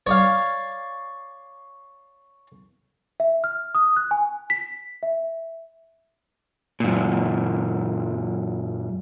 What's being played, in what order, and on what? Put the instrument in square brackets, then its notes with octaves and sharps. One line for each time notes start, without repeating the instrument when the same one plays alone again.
[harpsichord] C#5 D5 F5
[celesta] E5
F6
D#6
F#6
G#5
B6
E5
[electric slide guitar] F#2 A#2